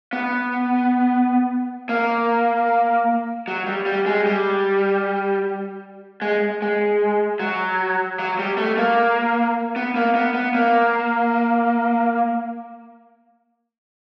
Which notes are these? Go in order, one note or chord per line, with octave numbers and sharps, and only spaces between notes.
B3
A#3
F#3
G3
G3
G#3
G3
G#3
G#3
F#3
F#3
G3
A3
A#3
B3
A#3
B3
B3
A#3